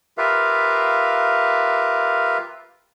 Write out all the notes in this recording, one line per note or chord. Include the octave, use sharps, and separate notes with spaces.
F4 G4 A#4 B4 E5 F5